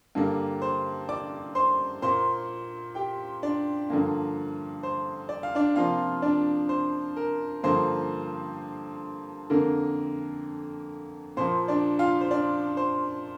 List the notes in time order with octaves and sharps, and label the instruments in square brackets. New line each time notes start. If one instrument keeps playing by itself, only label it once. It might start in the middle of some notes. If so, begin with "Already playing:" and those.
[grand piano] G2 D3 G3 A#3
C5
D5 D6
C5 C6
A#2 A#3 C5 C6
G4 G5
D4 D5
G2 D3 F3 A#3
C5
D5
F5
D4 D5
C3 F3 A#3 F4 F5
D4 D5
C5
A#4
G2 D3 F3 A#3 C5
F2 D3 A#3 A#4
A#2 F3 A#3 C5
D4 D5
F4 F5
C5
D4 D5
C5